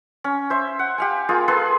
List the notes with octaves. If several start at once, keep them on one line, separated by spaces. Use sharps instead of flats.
C#4
C5 E5
F#5
G4 F5 G#5
A#3 F4 G#4
G#4 A4 B4 C6